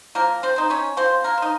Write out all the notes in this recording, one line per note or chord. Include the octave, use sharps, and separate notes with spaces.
F3 A#3 A#4
C4 C5
C4 D#4
C#4 C#5
F3 C4 C5
A#3 A#4
C4
D#4